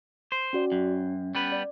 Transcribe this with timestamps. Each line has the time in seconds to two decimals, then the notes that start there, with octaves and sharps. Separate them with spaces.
0.32 C5
0.53 C#4 F#4 D5
0.72 F#2 C#4
1.35 G3 B3 B4
1.52 D5